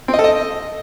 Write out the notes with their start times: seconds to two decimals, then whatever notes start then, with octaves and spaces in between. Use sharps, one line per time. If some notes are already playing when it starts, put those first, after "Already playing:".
0.08 C4
0.14 D#5
0.19 A4
0.24 D#5